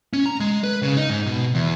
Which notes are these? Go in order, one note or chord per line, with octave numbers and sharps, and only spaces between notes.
C#4
A#5
G#3
B4
C#3
D#4
G#2
B2
E2